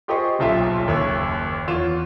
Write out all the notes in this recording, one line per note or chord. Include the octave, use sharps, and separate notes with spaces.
F4 G4 G#4 C5 D#5 C#6
D#1 B1 F4 E5
F#1 D#2 C#5 E6
E2 F4 C#5 E7